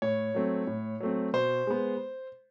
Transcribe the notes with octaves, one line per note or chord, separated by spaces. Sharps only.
A2 C#5
F#3 A3 C4
A2
F#3 A3 C4
B2 C5
G#3 B3